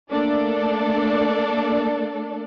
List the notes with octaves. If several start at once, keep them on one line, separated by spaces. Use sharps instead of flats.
A3 A#3 D4 A4 D5